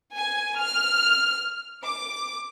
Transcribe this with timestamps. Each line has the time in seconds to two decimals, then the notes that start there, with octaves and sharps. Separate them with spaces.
0.16 G#5
0.59 F6
1.85 D6